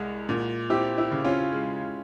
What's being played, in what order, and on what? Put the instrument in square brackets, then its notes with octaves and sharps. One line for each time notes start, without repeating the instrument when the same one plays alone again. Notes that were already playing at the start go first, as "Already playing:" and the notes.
Already playing: [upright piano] C2 G#3
A#2
[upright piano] C4 [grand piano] E4 G4
[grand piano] E4
[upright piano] C#3
[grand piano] C#4 F4
[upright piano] G#3